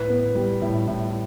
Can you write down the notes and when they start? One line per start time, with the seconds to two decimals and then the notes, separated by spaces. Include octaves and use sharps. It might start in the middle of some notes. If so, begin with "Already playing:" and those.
Already playing: A2 B4
0.09 B3
0.35 G3
0.62 A2
0.88 A2